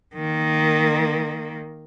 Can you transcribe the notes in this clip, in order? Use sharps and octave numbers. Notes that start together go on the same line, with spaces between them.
D#3 A#3